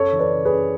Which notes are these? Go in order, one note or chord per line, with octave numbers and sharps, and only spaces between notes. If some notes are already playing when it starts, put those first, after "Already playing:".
Already playing: F#2 A4 C#5
E3
B4 D5
C#3
G#4 B4
F#2